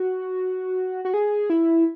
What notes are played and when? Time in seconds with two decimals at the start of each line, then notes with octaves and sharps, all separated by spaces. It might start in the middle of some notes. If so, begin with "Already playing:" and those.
Already playing: F#4
1.05 F#4
1.14 G#4
1.50 E4